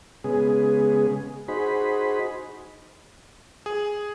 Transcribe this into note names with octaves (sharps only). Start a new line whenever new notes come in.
C#3 G#3 B3 G#4
D#4 F#4 G#4 C5 B5
G#4